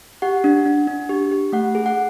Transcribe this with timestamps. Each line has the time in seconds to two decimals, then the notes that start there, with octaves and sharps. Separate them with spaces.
0.22 G4 F#5
0.44 D4
0.66 D4
0.87 D4
1.09 G4
1.31 G4
1.53 A3 F#5
1.75 G#4
1.86 F#5